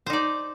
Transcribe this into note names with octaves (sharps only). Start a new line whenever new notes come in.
D#4 C5 D5